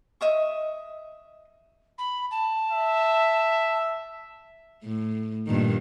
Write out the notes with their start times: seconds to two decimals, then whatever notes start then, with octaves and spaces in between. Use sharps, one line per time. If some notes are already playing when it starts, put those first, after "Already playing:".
0.21 D#5 E5 C#6
1.98 B5
2.30 A5
2.71 E5
4.84 A2
5.47 G2 A#2 D#3